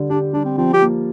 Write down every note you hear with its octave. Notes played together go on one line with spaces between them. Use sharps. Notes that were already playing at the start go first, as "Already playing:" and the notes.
Already playing: D3 G3
D4 G4
G3 D4
C4
F3 C4
G4
A#3